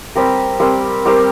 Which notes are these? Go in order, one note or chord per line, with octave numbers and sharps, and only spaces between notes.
G3 C4 G4 A#4
G3 C4 G4 A#4
G3 C4 G4 A#4